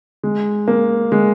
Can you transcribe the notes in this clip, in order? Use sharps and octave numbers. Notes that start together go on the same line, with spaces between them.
G#3
A#3
G#3